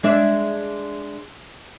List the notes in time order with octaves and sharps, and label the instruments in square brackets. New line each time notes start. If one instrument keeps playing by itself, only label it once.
[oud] G#3 D4 E5